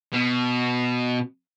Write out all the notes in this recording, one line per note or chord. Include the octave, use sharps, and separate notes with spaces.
B2